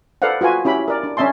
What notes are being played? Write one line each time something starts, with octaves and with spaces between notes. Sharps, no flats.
A4 B4 C5 D5 F5 F#5
F4 F#4 B4 G#5
C#4 E4 G4 B5
A#4 D5
D4
C#4 D4 E5 A5 C6